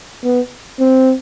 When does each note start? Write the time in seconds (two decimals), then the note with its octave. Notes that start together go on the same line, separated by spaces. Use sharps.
0.24 B3
0.80 C4